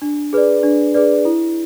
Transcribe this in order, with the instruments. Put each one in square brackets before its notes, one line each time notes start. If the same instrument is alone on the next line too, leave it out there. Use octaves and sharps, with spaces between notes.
[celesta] D4
G#4 B4 D5
D4
G#4 B4 D5
E4